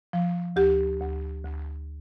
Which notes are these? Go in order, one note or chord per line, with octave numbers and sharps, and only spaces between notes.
F3
D2 G4
D2
D2